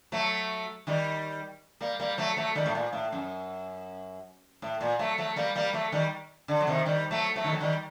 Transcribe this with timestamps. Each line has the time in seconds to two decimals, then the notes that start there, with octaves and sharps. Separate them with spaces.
0.12 F#3 A3
0.87 D#3 G3
1.81 G3 A#3
2.00 G3 A#3
2.18 F#3 A3
2.36 F#3 A3
2.55 D#3 G3
2.66 A2
2.75 A#2
2.93 A2
3.12 F#2
4.62 A2
4.81 A#2
4.99 F#3 A3
5.18 F#3 A3
5.36 G3 A#3
5.55 G3 A#3
5.73 F#3 A3
5.92 D#3 G3
6.48 D3
6.60 F#3
6.67 C3 D#3
6.86 D#3 G3
7.11 F#3 A3
7.36 F#3 A3
7.44 D#3
7.53 F#3
7.61 D#3 G3